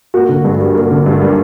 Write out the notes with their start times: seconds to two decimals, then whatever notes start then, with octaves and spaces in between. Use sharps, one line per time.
0.14 A#3 F#4
0.29 D3
0.44 G2
0.60 G3
0.75 A#3
0.91 D3
1.06 G2
1.21 G3